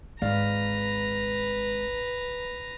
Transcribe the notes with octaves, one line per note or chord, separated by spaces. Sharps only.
G#1 G#3 B4 D5 F5 A#5